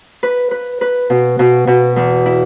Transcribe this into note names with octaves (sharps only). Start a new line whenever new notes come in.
B4
B4
B4
B2
B2
B2
E2
E4